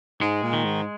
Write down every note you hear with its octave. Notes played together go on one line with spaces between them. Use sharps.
G#2 G#3
A#2
D#3
G#2